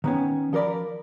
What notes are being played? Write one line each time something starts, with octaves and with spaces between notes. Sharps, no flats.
D#3 B3 C#4
F3 A4 A#4 D5 B5